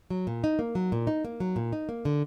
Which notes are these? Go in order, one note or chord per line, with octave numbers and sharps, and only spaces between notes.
F#3
A#2
D#4
A#3
F#3
A#2
D#4
A#3
F#3
A#2
D#4
A#3
D3